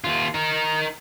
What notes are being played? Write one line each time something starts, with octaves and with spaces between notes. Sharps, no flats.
D#2 F4
D#4 A#4